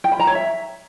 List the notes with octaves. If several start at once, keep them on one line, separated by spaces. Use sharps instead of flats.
G5
B5
A#5
C#5
E5